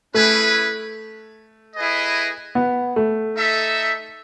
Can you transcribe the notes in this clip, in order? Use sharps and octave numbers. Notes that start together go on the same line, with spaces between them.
A3 C#4 E4 G#4 B4
E4 G#4 B4 D#5
B3
A3
D#4 A4 E5